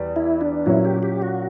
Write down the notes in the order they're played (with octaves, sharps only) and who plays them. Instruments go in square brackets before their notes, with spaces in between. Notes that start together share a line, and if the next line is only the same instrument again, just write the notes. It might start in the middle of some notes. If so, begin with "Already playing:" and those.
Already playing: [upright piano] E2 G3
[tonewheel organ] E4
D4
[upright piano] A#2 F#3 C#4 [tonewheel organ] E4
[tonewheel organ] G4
G4
F#4